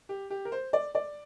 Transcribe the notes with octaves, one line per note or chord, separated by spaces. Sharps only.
G4
G4
A#4
C5
D5
D5